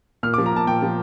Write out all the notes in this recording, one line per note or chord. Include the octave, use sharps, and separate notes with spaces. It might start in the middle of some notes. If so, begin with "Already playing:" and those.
A#2 F6
D6
F3
A#5
A#2 A5
A#2 G5
F3